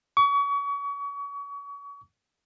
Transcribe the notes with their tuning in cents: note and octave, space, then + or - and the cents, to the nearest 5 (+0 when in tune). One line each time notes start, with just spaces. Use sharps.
C#6 +35